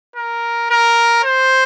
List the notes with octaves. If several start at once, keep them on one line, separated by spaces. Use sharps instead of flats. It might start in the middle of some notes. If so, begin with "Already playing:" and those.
A#4
A#4
C5